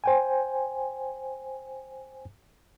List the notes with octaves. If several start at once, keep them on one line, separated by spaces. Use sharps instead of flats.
C5 G5 G#5